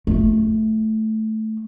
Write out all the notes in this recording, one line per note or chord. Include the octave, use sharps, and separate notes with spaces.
A3 F4